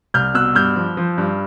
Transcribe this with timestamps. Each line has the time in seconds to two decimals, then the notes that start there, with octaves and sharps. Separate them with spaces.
0.14 C2 F6 G6
0.34 B2 E6 F#6
0.55 G2 F6 G6
0.76 F3
0.97 F3
1.18 G2